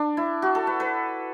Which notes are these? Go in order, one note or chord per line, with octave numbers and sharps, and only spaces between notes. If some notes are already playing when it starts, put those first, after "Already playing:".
Already playing: D4
E4
F#4
A4
B4
B4